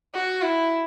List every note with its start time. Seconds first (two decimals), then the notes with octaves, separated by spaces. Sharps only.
0.14 F#4
0.42 E4